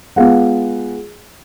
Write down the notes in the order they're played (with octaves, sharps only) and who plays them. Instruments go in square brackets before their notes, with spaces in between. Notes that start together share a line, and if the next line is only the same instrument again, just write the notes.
[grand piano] G#3 B3 F4 G#4 F5 F#5